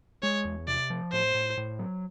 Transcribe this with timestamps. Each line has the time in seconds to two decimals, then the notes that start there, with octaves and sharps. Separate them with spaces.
0.23 G#3 C#5
0.45 E2
0.68 C3 D5
0.90 F3
1.12 A2 C5
1.35 A2
1.57 A2
1.79 F#3